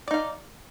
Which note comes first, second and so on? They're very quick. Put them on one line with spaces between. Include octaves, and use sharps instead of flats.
D5 D#4 F5